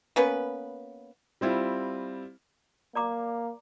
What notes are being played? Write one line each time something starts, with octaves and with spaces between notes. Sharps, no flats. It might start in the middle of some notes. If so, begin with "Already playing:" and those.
A#3 B3 C#4 B4
G3 C4 E4 F4
A#3 D5 A#5 D6